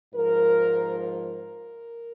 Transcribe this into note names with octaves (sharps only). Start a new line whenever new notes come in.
G#2 F3 A#4
A#4